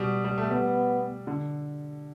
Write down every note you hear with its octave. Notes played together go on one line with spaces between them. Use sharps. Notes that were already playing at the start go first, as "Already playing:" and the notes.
Already playing: B2 G3
G3
A3
G3 B3
D3